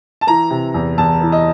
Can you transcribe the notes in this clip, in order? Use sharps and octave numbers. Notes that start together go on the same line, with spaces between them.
A5
E3 A#5
C3
E2
E2 A5
E3
D#5